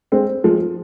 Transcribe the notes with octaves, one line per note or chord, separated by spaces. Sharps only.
G#3 C4
F3 G#3